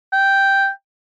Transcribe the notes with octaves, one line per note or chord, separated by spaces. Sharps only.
G5